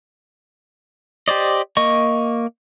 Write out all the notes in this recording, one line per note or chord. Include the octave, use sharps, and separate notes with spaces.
G4 C5 D5 D#5
A#3 D#5 C#6